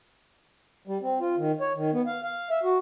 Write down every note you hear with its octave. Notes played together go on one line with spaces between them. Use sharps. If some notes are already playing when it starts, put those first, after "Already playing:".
G3
C4
F4
D#3
C#5
D#3
B3
F5
F5
E5
F#4